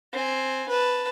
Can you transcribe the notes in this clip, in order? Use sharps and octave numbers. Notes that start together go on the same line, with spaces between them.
C4 G#5
B4 A5